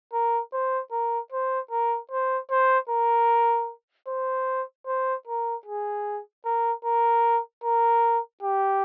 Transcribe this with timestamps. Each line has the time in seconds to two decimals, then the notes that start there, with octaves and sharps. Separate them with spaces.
0.13 A#4
0.53 C5
0.92 A#4
1.32 C5
1.71 A#4
2.11 C5
2.51 C5
2.89 A#4
4.08 C5
4.87 C5
5.28 A#4
5.66 G#4
6.45 A#4
6.85 A#4
7.64 A#4
8.43 G4